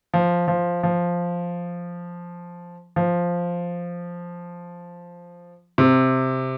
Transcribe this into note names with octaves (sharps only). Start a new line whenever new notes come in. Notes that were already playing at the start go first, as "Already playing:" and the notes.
F3
F3
F3
F3
C3